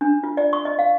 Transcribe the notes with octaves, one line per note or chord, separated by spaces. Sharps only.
D4
F4
D5
C#6
D#5
F5